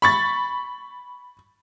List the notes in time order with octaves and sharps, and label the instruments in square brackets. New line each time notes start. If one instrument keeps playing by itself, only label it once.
[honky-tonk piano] B5 C#6 A6